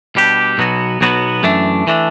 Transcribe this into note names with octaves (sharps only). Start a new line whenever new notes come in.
B2 G3 D4 G4
B1 B2 F#3 B3 F#4
B1 B2 F#3 B3 F#4
F#2 E3 A3 D4
E3 A3 D4